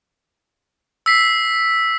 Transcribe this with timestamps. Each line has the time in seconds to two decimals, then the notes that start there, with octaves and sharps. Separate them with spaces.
1.06 E6 B6 C7